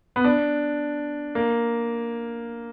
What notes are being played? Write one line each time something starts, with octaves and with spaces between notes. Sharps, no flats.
B3
D4
A#3